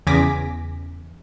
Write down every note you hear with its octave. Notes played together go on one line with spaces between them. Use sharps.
E2 C#3 G#5 D6 A#6 B6